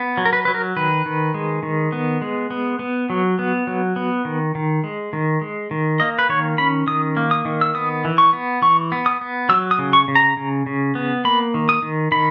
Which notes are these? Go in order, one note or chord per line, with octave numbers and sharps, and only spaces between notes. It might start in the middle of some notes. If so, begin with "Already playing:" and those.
Already playing: B3
F#3
A#4
B4
F#3 B4
A#4
D#3 B4
D#3
G#3
D#3
B3
G#3
B3
B3
F#3
B3
F#3
B3
D#3
D#3
G#3
D#3
G#3
D#3
A#3 D#5
B4
D#3 C#5
C#4 B5
D#3 D#6
A#3
D#6
D#3
E6
B3 D#6
E3
C#6
B3
E3 C#6
B3
D#6
B3
F#3 E6
D#6
C#3
C#6
C#3
A#5
C#3
C#3
B3
A#3 B5
D#3
D#6
D#3
D#3 B5